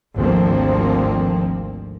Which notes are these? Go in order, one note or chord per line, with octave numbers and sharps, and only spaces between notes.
G#1 D2 F3 A#3 C4